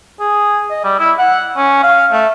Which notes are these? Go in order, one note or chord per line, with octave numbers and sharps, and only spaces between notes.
G#4
D#5
G3
E4
F#5
C#4
F5
A3